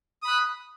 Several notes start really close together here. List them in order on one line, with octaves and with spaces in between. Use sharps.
D#6 B5 F#6